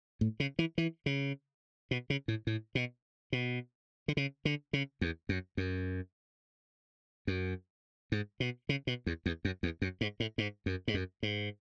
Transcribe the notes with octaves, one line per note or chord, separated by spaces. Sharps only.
A2
C#3
E3
E3
C#3
B2
C#3
A2
A2
B2
B2
D3
C#3
D3
C#3
E2
F#2
F#2
F#2
G#2
B2
C#3
B2
E2
E2
F#2
E2
F#2
G#2
A2
G#2
F#2
G#2
F#2
G#2